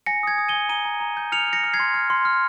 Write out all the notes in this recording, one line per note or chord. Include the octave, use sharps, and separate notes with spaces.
G#5 A#6 C#7
D#6 G#6
D#6
G#5 D#7 G7
A#5 D#7 G7
A#5
A#5
G6
F6 C#7 F7
F6 A#6 C#7
F6
G#6 C7
C6
F6
C6
F6